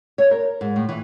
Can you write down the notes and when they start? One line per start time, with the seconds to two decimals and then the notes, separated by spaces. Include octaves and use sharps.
0.18 C#5
0.31 A#4
0.61 G#2
0.76 A2
0.89 E3